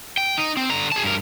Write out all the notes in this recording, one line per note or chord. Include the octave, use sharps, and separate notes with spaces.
G5
D#4
C4
D3 A#5
G#4 A5
G2 A#4